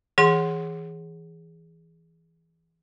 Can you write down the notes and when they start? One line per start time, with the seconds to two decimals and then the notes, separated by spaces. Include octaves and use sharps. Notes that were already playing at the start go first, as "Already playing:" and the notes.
0.18 E3 G#4 F#5 C6